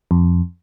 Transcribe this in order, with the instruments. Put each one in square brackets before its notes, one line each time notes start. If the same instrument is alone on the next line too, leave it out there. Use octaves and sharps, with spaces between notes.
[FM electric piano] F2